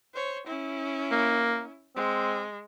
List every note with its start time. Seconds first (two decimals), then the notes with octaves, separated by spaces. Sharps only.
0.14 C5 C#5
0.47 C#4 E4
1.11 A#3
1.96 G#3 C4